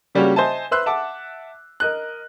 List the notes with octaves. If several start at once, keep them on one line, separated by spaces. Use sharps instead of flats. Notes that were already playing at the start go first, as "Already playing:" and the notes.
C#3 G3 A#3 C#4 F#4 G4
C5 D#5 E5 G#5 A5
B4 C5 E5 C6 E6 F#6
E5 F#5 A5 D6
A#4 D#5 F#6